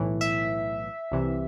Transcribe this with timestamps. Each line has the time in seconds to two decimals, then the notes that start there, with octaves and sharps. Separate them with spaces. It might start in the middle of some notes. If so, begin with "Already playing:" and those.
Already playing: B1 A2 E3
0.21 E5
1.12 C2 C3 E3